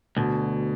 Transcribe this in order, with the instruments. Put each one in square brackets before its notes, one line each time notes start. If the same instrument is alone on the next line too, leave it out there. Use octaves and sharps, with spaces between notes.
[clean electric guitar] D2 [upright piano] B2